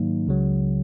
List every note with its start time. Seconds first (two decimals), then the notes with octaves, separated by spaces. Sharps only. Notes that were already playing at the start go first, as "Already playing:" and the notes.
Already playing: G#2 D#3 F#3 A#3 D#4
0.27 C#2 C#3 F#3